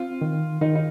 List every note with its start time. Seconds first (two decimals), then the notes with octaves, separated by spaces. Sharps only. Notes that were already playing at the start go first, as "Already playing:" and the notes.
Already playing: C4 F4
0.21 D#3
0.61 D#3 D#4
0.75 D#4